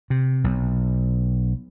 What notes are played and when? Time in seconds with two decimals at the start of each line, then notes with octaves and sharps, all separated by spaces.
0.10 C3
0.44 B1